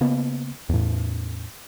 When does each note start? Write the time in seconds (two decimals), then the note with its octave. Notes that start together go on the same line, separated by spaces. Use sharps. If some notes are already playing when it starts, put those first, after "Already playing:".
0.01 C#3 A#3 B3
0.69 E2 A2